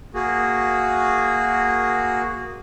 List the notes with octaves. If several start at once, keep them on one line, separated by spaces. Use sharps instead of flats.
A#3 F#4 G#4